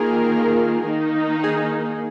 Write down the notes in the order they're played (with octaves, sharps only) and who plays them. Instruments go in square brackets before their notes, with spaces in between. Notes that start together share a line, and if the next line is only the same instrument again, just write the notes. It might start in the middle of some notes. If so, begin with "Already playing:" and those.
Already playing: [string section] D#3 A#3 F4 A#4 [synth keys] G#4
[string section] D#3 A#3 D#4
[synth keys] G#4